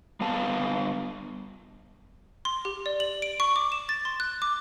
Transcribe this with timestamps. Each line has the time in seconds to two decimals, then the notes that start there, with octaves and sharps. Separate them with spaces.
0.21 G3 B3 F5 A5
2.45 C6
2.65 G4
2.86 D5
3.00 F#7
3.22 D7
3.40 C#6
3.56 D6
3.72 E7
3.89 A6
4.05 C6
4.20 F#6
4.42 D6